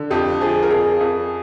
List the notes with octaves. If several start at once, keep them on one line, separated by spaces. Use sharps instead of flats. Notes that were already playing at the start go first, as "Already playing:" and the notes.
Already playing: D3
F2 G4
F3 G#4
A#4
F2 G#4
F2